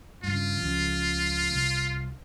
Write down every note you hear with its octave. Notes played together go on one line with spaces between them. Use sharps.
G2 C#3 F4
C#2 C#3 F3
C2